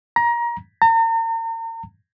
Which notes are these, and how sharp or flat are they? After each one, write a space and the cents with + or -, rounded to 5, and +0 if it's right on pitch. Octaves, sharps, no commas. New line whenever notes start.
A#5 +25
A#5 -40